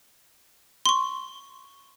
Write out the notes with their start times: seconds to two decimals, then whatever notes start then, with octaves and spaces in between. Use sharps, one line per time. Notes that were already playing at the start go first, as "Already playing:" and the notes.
0.86 C6 C#6